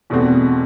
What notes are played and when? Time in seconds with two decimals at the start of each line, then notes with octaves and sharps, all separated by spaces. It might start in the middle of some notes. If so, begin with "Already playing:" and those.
0.10 E2 B2 A3 C4 F#4